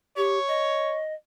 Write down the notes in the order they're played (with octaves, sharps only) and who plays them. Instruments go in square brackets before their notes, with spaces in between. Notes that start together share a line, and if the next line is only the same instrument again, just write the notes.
[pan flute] G4 [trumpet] C#5
[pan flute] D#5